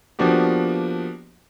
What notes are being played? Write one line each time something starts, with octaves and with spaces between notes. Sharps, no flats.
F3 A#3 B3 D4 F#4 G4